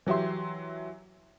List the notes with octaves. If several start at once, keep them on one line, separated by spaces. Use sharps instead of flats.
E3 F#3 G4 E5 C6